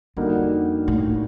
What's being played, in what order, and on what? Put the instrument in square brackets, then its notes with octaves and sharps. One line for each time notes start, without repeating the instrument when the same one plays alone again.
[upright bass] F2 [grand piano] D3 G3 A#3 D#4 F#4
[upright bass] A2